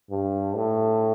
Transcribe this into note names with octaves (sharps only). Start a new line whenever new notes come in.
G2
A2